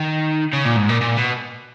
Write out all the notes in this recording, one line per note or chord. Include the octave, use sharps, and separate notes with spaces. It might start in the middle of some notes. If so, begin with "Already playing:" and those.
Already playing: D#3
C#3
A#2
G#2
A#2
A#2
B2